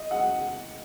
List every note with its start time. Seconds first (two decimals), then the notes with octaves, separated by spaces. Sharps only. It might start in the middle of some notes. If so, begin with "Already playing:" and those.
Already playing: D#5
0.11 F#5